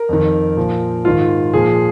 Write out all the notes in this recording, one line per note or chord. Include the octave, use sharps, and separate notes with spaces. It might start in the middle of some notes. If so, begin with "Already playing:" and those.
Already playing: A#4
F2 D#3
A#2 F3
G#2 D#3 F4
A#2 F3 G#4